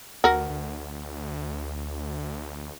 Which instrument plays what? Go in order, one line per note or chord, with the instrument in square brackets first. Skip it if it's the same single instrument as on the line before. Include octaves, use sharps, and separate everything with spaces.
[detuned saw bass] D2 [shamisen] F#4 A#4
[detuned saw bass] D2